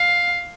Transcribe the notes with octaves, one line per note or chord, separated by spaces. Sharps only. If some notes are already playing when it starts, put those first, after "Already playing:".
Already playing: F5